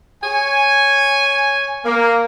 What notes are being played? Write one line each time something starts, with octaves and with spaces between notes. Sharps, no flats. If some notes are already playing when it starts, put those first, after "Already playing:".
C#5 G#5
A#3